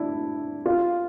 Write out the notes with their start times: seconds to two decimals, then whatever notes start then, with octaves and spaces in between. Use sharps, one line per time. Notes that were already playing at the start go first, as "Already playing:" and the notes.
Already playing: D4 E4
0.66 F4